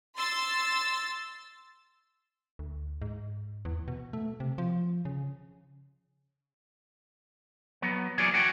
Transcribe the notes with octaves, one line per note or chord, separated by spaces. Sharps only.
C6 E6 A6
D2
G#2
E2
B2
A3
C3
F3
C#3
F#3 B3
E3 F#3 A#3 G#4 C#5 D5
F#4 C#5 G5